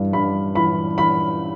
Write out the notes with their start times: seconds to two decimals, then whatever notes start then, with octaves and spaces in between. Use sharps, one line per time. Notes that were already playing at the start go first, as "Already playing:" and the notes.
Already playing: G2 E3
0.13 G2 B5
0.55 E3 B5
0.98 E3 B5